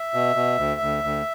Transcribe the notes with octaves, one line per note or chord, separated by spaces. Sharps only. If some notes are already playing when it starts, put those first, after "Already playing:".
Already playing: E5
B2
B2
D2
D2
D2